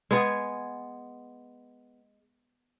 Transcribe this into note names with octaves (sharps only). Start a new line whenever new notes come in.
G#3 B3 G#4